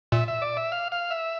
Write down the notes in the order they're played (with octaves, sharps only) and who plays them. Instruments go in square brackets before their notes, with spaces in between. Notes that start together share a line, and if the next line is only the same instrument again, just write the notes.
[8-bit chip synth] A#2 [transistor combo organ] E5
[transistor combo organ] E5
D5
E5
F5
F5
E5